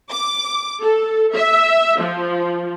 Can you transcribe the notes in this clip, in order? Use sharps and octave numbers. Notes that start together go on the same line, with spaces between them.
D6
A4
E5
F3